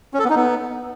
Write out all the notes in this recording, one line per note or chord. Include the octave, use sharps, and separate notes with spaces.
C#4
A4
B3
D#4
B3